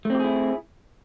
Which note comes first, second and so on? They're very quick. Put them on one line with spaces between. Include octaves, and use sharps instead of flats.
A3 C4 G4 G#4 E4